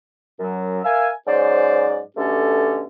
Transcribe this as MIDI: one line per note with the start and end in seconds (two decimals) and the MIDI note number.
0.39 0.78 42
0.39 0.78 54
0.83 1.09 70
0.83 1.09 76
0.83 1.09 77
0.83 1.09 80
1.26 1.99 44
1.26 1.99 54
1.26 1.99 61
1.26 1.99 72
1.26 1.99 74
2.16 2.87 47
2.16 2.87 50
2.16 2.87 57
2.16 2.87 61
2.16 2.87 67
2.16 2.87 69